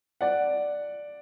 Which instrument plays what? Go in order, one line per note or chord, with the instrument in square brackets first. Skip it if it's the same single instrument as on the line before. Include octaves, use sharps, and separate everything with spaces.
[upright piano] D5 F#5